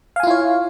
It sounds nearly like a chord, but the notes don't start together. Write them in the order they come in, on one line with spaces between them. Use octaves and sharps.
F5 G#5 F4 E4 C#5